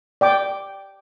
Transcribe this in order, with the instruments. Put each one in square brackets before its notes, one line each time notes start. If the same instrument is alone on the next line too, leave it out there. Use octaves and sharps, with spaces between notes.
[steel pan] D5 G5 D6